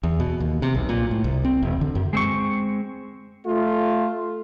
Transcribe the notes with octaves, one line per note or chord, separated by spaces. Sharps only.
E2
B2
D#2
C3
B1
A#2
A2
C2
C4
E1
D3
F#2
G#3 C4 C#6
A3 F4